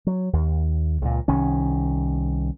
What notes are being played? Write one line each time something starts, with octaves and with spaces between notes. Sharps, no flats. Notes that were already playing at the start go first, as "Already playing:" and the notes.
F#3
D#2
C#2 A#2
C2 D#3 C#4